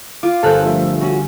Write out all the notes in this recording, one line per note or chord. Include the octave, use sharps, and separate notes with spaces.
F4 D6
G1 A4 A#4 C5 A5 F6 F#6
F3 A3 E5
C#4 F#4